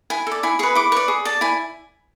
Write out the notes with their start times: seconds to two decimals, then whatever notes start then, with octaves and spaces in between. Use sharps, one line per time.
0.10 E4 G#5
0.27 A4 D5
0.43 E4 G#5
0.59 G#4 B4 C#6
0.75 E4 D6
0.92 B4 D5 C#6
1.08 G#4
1.25 D5 A5
1.41 E4 G#5